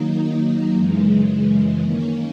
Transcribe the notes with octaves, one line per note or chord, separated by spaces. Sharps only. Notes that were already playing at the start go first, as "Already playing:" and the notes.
Already playing: D#3 F#3 A#3 D#4
F#2 C#3 E3 G#3
D#3 A#3 C#4